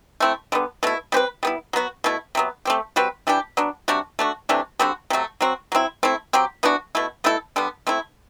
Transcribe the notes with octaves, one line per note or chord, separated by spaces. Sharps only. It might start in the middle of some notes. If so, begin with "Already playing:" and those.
A3 C4 E4
D3 G3 B3
B2 A3 E4
G3 C4 G4 B4
G3 B3 E4
F#3 B3 F#4
B2 A3 E4
C3 F#3 B3
A3 C4 G4
G3 C4 F#4 B4
E3 G3 D4 G4
F#3 B3 D4
C3 G3 D4 F#4
A3 D4 F#4
C3 E3 A3 D4
D3 G3 C4 F#4
C3 F#3 A3
F#3 C4 F#4
F#3 C4 E4
A3 C4 E4
F#3 C4 G4
E3 B3 D4 F#4
B2 A3 E4
B2 A3 E4 A4
D3 G3 B3
A3 C4 E4